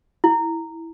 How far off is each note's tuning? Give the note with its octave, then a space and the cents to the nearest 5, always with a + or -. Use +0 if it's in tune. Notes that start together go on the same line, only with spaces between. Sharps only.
E4 -10